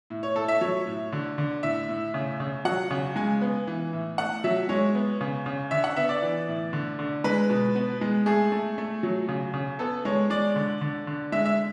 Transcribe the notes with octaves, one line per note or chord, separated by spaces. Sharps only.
A2
C#5
A2 A4
E5
F#3 C#5
A2
D3
D3
A2 E5
A2
C#3
C#3
F#3 F#5
C#3
G#3 G#5
B3
E3
A2
A3 F#5
F#3 E5
G#3 C#5
B3
C#3
C#3
D3 E5
F#5
B3 E5
D5
E3
A2
D3
D3
G#3 B4
B2
B3
G#3
A3 G#4
A3
A3
F#3
C#3
C#3
B3 A4
G#3 C#5
G#3 D5
D3
D3
D3
G#3 E5
E5